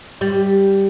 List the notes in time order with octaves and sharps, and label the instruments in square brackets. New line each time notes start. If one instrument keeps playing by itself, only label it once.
[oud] G3